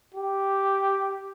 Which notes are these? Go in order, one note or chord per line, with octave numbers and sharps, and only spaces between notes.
G4